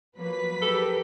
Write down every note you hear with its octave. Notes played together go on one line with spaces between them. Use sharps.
F3 F#3 A#3 B4 B6
G4 A4 A#4